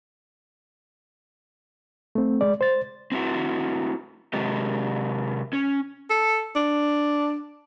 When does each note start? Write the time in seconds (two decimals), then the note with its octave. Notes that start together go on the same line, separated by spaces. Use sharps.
2.15 A3 C4
2.41 G#3 D5
2.61 C5 A6
3.12 C4 E4 F#4
4.33 C3 F#3 G#3 C4 G4 D#5
5.53 C#4
6.10 A4
6.56 D4